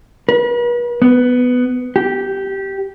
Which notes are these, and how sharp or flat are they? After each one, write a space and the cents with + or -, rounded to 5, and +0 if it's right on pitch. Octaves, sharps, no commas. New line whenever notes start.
B4 -40
B3 +10
G4 -10